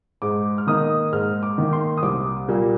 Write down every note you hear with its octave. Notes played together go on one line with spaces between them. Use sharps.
G#2 D6
F6
D#3 A#3 D#4 D#6
G#2 F6
D6
D#3 A#3 D#4
C6
D#6
C2 D6
A#2 G3 A#3